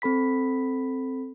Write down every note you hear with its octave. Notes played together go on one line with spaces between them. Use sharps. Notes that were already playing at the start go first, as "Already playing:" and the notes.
C4 A4 B5 B6